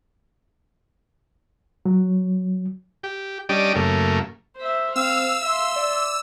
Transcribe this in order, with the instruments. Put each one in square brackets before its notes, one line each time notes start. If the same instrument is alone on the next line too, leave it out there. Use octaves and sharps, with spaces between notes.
[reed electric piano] F#3
[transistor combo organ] G4
G3 C#4 D4 G4 D5 D#5
F#2 C#3 A3 A#3
[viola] C5 E5
[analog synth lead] C4 [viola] F5 [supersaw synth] E6
[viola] E5 C6 [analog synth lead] F5
[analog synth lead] D5